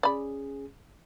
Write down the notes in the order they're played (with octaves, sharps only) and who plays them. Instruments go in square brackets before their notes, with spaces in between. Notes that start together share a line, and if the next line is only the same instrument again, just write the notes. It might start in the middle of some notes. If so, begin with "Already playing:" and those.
[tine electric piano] C#4 G#4 [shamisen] D5 B5